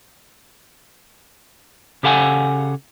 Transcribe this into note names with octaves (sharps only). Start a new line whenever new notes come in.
C#3 G4 A4 F5 F#5 G#5